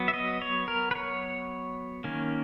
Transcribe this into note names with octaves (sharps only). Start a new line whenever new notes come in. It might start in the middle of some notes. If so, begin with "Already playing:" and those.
Already playing: F#3 B3
E5
D#5
C#5
A#4
B4
C#5
D#3 A#3 C#4